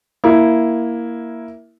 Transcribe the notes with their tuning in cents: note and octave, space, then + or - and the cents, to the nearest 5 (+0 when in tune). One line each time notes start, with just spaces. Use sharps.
A#3 +5 E4 +0